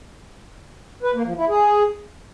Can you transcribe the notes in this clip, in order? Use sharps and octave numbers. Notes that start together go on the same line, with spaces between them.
B4
A#3
F3
E4
G#4